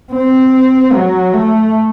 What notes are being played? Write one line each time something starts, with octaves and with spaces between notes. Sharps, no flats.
C4
F#3
A3